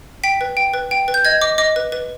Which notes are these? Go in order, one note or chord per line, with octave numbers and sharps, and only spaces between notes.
G5 B6
B4
G5
B4
G5
B4
G6
D#5 G#6
D#5 D6
D#5 D6
B4
B4